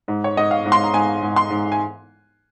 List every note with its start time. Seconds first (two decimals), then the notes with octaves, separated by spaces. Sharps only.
0.08 G#2
0.24 C#5
0.37 G#2 D#5
0.51 F5
0.65 G#2
0.72 C6
0.84 A#5
0.93 G#2 G#5
1.22 G#2
1.36 C6
1.50 G#2
1.72 G#5